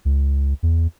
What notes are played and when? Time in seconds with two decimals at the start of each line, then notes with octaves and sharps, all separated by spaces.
0.05 C#2
0.63 E2